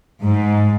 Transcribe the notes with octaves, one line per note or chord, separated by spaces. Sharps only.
G#2